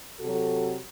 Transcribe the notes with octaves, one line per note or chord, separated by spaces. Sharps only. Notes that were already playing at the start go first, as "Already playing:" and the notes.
C3 F#3 F#4 A4